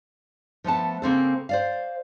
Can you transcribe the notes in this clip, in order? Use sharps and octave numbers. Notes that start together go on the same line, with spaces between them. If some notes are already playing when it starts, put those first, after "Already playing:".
F3 A3 B3 A5
C#3 A#3 C4 A4
C5 D5 F5